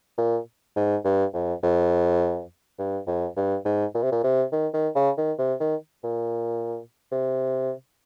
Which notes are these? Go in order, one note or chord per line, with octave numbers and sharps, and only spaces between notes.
A#2
G#2
G2
F2
F2
G2
F2
G2
G#2
A#2
C3
A#2
C3
D#3
D#3
C#3
D#3
C3
D#3
A#2
C3